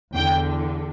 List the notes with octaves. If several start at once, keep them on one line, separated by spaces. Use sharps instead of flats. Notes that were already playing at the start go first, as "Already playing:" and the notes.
E2 D3 G5